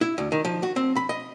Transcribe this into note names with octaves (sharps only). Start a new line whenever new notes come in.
E4
D2
D#3
F3
F#4
C4
B5
D#5